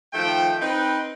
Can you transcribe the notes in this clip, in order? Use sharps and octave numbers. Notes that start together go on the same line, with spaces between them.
D#3 F3 A3 G5
C4 D#4 B4